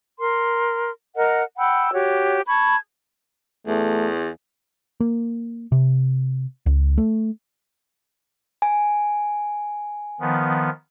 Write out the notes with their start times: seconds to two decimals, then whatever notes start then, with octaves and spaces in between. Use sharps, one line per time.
0.19 A#4 C6
1.16 A#4 D#5 F#5
1.58 F#5 G5 B5 E6
1.93 F#4 G4 C#5
2.48 A5 B5 C#6 G#6
3.67 E2 A3
5.00 A#3
5.72 C3
6.66 C#2
6.98 A3
8.62 G#5
10.20 D#3 F3 B3